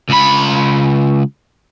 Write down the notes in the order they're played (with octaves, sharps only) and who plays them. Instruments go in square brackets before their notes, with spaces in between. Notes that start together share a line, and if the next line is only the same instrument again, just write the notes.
[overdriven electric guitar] C#2 B5